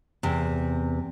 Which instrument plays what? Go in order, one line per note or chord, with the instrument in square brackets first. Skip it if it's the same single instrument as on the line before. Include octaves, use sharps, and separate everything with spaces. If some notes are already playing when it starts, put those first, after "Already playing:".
[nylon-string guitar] E2 C3